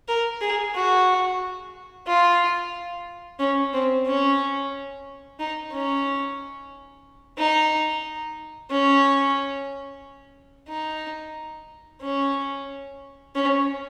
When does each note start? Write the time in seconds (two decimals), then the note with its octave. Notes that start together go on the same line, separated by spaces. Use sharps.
0.08 A#4
0.41 G#4
0.75 F#4
2.07 F4
3.39 C#4
3.73 C4
4.06 C#4
5.39 D#4
5.72 C#4
7.38 D#4
8.70 C#4
10.69 D#4
12.02 C#4
13.35 C#4